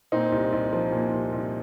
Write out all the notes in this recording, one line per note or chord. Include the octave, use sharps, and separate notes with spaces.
A#2 C4 D#4
C2
C2
F3
A#2
C2
C2